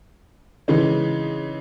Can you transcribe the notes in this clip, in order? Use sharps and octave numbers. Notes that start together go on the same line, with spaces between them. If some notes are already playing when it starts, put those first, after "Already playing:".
C#3 E3 G#3 D#4